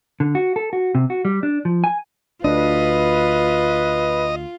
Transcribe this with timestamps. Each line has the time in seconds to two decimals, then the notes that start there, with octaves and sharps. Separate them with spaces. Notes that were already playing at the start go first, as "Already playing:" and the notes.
0.20 D3
0.35 F#4
0.56 A4
0.73 F#4
0.95 C3
1.10 F#4
1.25 G3
1.43 D4
1.65 F3
1.84 G#5
2.44 D2 D4 F4 B4 D#5